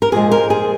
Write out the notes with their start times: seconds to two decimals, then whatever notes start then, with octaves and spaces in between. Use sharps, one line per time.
0.02 A#4
0.12 A#2 F3 G#3 G#4
0.31 A#4
0.50 G#4